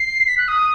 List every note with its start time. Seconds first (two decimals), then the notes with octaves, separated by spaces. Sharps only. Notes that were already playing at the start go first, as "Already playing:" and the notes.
Already playing: C7
0.28 B6
0.38 F#6
0.48 D#6